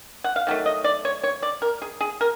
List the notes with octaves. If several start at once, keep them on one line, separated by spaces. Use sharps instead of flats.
F#5
F5
D#3 F#3 A3
D#5
D5
C#5
C#5
D5
A#4
G#4
G#4
A#4